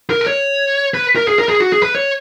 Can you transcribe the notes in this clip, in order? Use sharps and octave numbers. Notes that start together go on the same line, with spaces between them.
A#4
B4
C#5
B4
A#4
G#4
A#4
G#4
F#4
G#4
B4
C#5